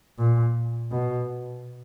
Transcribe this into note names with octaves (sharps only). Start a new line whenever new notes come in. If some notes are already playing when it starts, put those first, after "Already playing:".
A#2
B2